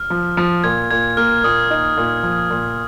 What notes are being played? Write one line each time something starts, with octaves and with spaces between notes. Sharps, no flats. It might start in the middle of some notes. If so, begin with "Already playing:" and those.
Already playing: F6
F3
F3
A#2 G#6
A#2 G#6
A#3 F6
A#2 D#6
D#4
A#2
F3
A#2